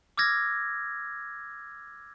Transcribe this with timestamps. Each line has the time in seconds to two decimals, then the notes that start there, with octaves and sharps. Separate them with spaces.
0.18 D6 E6 F6 G#6 A#6